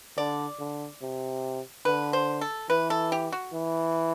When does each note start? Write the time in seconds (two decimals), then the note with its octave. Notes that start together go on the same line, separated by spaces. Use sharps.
0.17 D3 D5
0.59 D3
1.02 C3
1.85 D3 B4
2.13 C5
2.41 A4
2.70 E3 B4
2.90 A4
3.12 G4
3.32 F#4
3.53 E3